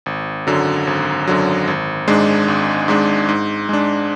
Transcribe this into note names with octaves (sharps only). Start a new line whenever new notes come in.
G#1
F#2 D3 F#3
G#1
F#2 D3 F#3
G#1
G#2 G#3 D4
G#1
G#2 G#3 D4
G#2
G#3 D4